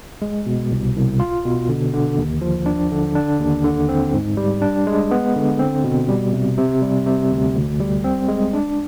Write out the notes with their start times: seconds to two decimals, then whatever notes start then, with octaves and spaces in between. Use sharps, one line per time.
0.22 G#3
0.46 B2
0.71 C2
0.96 C2
1.20 F4
1.45 B2
1.69 D3
1.93 D3
2.18 D#2
2.41 F3
2.66 D4
2.92 D3
3.15 D4
3.40 D#2
3.64 D3
3.89 C4
4.13 G#2
4.37 G3
4.62 D4
4.87 G#3
5.11 B3
5.35 D3
5.59 C4
5.84 B2
6.09 G3
6.33 C3
6.57 C3
6.82 G3
7.07 C3
7.31 D2
7.56 D2
7.80 G3
8.04 C4
8.28 G#3
8.53 D4